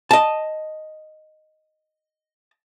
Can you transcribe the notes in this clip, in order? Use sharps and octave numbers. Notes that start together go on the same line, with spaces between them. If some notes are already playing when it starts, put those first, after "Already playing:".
D#5 A5